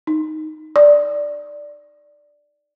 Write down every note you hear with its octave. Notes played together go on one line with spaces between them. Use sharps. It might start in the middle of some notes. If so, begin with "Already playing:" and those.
D#4
D5